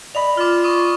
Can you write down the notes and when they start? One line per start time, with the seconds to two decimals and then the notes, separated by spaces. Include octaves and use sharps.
0.15 D5 D#5 B5 F7
0.37 F4 D6 F6
0.64 C#6 D#6